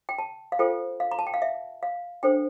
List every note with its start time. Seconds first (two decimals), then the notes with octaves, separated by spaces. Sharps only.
0.09 G5
0.18 A5
0.52 F5
0.59 F4 A4 C5 G5
1.00 F5
1.11 A#5
1.19 A5
1.27 G5
1.34 F5
1.42 E5
1.83 F5
2.23 D4 A4 C5 G5